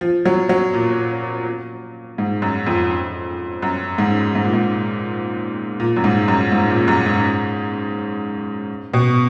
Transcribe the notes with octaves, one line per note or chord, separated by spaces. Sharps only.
F3
F#3
F#3
A#2
G#2
F#2
F2
F#2
G#2
G#2
A#2
G#2
A#2
F#2
G#2
F#2
G#2
A#2
F#2
G#2
B2